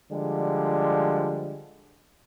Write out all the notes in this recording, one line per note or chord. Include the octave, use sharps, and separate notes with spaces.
D3 F3 G3 G#3